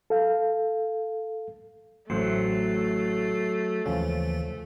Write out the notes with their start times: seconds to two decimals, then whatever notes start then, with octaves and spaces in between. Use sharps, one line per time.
0.10 A4 F5
2.10 A1 A2 F#3 A3 C5 C7
3.86 D#2 C#3 E3 F3 C#4